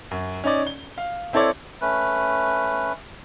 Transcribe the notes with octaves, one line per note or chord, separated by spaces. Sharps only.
F#2
C#4 D#4 D5
G7
F5
C4 E4 A4 C#5 D5
A3 C#4 B4